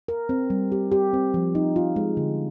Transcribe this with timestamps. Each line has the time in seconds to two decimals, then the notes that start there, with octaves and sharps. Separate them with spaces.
0.08 A#4
0.29 C4
0.50 G3
0.72 G4
0.92 G4
1.14 C4
1.34 F3
1.55 D#4
1.76 F4
1.96 G#3
2.17 D3